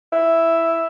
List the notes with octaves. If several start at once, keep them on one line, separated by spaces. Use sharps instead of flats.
E4